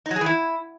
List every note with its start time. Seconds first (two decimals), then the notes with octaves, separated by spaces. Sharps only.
0.06 D#4
0.11 F#3
0.16 G#4
0.21 E3
0.26 E4